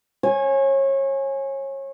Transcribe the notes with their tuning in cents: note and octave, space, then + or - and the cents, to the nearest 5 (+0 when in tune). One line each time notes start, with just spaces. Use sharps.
C#5 -30 G#5 +0